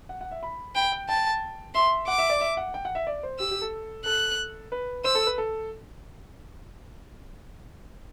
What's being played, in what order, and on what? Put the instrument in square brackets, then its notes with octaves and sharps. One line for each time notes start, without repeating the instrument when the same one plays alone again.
[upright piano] F#5
F#5
E5
B5
[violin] G5 [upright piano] B5
[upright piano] G5
[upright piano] G5 [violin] A5
[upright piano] E5 [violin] C6
[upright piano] F#5 [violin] D6
[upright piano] E5
D5
E5
F#5
G5
F#5
E5
D5
C5
[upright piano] G4 [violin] E6
[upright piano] G4
A4
[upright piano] A4 [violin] F#6
[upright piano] B4
[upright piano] C5 [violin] E6
[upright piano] A4
B4
A4